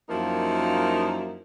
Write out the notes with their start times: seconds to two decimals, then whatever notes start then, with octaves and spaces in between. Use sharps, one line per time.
0.09 F#2 F3 A#3 D#4 E4 A#4